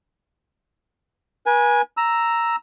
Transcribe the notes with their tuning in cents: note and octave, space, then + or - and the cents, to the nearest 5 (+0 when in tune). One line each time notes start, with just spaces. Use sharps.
B4 -40 G#5 +0
A#5 +0 E6 +0